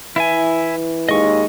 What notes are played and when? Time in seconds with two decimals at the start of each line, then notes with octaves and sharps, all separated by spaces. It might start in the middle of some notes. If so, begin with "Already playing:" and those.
0.16 E3 E4 E5 G#5
1.09 D#2 G#3 D#5 C#6